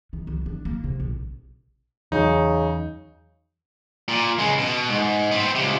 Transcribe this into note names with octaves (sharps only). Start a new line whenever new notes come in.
D#3
C2
D4
A#3
C3
A#1
E2 C#3 F#3 D#4
A#2
C#3 G#3
B2
G#2
B3 C4
C#2 C3